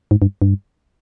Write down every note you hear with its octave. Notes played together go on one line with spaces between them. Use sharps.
G#2
G2
G2